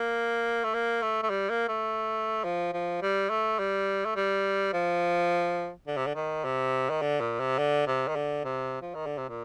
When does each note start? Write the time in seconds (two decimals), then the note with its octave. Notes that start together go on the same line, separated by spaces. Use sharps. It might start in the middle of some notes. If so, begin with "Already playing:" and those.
Already playing: A#3
0.64 A3
0.74 A#3
1.02 A3
1.23 A3
1.30 G3
1.50 A#3
1.68 A3
2.45 F3
2.73 F3
3.02 G3
3.30 A3
3.59 G3
4.05 A3
4.16 G3
4.73 F3
5.87 D3
5.97 C3
6.06 D3
6.15 D#3
6.44 C3
6.90 D#3
7.02 D3
7.20 A#2
7.40 C3
7.58 D3
7.87 C3
8.08 D#3
8.16 D3
8.44 C3
8.82 F3
8.95 D#3
9.06 D3
9.18 C3
9.29 A#2